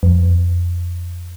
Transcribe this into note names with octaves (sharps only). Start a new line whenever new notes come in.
F2